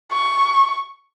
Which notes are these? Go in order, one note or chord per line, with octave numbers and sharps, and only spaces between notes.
C#6